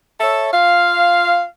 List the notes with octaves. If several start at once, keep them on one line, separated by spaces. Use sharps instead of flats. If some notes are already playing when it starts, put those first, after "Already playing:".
A4 C#5 E5
F4 F5